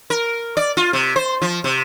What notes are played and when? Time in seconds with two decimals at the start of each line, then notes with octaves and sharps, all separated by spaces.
0.10 A#4
0.57 D5
0.77 F4
0.93 C3
1.16 C5
1.42 F3
1.64 C3